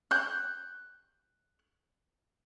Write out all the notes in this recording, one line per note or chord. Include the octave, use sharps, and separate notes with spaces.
F#6 G6